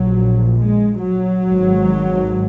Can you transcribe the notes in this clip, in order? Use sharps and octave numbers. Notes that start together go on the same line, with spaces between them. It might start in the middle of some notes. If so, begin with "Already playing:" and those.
Already playing: A#1 A#2 F#3
G#3
F#3
G#1 G#2